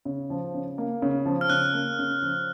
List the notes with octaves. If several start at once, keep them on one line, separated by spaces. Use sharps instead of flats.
C#3
F3
C#3
A#3
C#3
F3
F6
C#3 F#6
A#3
C#3
F3